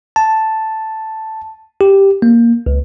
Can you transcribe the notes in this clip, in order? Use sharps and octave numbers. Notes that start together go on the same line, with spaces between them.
A5
G4
A#3
C#2